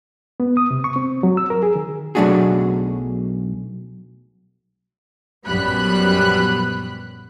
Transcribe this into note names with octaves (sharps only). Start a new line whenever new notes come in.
B3
D#6
C3
C#6
C4
F#3
E6
A#4
G#4
D#3
B1 F#3 A3 D4 F#4 G#4
A#1 F#2 G3 B3 B5 F#6